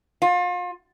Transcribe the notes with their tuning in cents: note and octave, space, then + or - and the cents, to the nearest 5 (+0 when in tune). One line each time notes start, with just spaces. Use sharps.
F4 +35